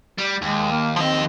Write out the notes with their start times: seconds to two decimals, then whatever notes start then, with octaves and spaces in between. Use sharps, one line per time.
0.19 G3
0.42 D#2 G#3
0.71 A#3
0.96 F3 C4 D#5